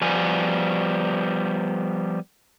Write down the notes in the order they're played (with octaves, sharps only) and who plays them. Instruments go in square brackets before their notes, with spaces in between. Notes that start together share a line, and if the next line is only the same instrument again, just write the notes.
[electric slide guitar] F3 G3 B3 G#5